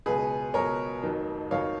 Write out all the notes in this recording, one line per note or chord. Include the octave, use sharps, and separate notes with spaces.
C#2 B2 F#3 G#4 B4
C#2 B2 F#3 A#4 C#5
F1 F2 D#3 F#3
F2 D#3 F#3 C#5 F5